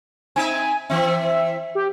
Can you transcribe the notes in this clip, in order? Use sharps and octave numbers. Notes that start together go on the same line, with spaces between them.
C4 D#4 E5 G#5
E3 C4 E5
G4